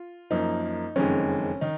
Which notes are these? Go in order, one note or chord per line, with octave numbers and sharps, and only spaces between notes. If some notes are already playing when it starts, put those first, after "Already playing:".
Already playing: F4
F#2 F3 A#3 D#4
F#1 F2 D#3 G#3 C#4
D#3 D#4